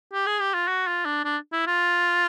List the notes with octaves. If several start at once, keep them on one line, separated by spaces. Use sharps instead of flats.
G4
G#4
G4
F4
F#4
F4
D4
D4
E4
F4